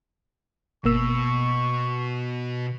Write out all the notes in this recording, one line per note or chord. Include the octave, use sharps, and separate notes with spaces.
G1 B2 A#3 C#6 E6